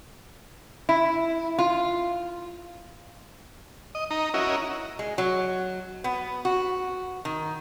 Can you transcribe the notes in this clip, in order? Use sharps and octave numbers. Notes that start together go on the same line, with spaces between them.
E4
F4
D#5
D#4 A#5
C#4 E4 F#4 A#4 D#5
G#3
F#3
B3
F#4
D#3